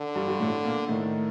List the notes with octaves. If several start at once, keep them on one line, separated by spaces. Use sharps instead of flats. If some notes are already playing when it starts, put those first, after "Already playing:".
Already playing: D3
G2 G3
G2 G3
A2 A3
A#2 A#3
A2 D#3 A3